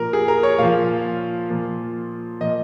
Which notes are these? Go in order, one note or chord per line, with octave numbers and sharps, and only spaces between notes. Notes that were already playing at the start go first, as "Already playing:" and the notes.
Already playing: A#2 F3 A#4
G#4
A#4
C#5
A#2 F3 F5
A#2 F3
A#2 F3 D#5